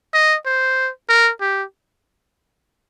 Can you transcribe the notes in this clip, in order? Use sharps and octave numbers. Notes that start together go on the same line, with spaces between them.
D#5
C5
A#4
G4